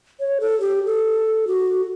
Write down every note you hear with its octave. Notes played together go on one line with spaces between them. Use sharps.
C#5
A4
G4
A4
F#4